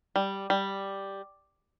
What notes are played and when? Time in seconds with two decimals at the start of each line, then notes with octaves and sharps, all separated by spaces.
0.16 G3
0.50 G3